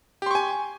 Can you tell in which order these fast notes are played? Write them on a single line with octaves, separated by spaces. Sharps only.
G4 C6 C#6 G#5